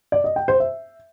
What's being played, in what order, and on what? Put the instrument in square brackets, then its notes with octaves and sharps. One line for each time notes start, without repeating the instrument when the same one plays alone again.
[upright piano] D5
D#5
G5
C5
E5